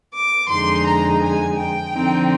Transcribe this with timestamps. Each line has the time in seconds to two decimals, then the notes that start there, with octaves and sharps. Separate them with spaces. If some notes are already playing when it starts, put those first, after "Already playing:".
0.15 D6
0.50 F2 D3 G#3 D#4 C6
0.86 A#5
1.22 G#5
1.57 G5
1.94 D3 F3 C4 D#4